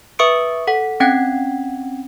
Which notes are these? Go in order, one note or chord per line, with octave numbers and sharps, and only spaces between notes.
B4 E5 C#6 D#6 C#7 D7
A4 F#5
C4 C#4 F#5 G5 G#6